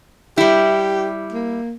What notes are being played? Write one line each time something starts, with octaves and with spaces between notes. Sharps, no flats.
G3 E4 G4
A#3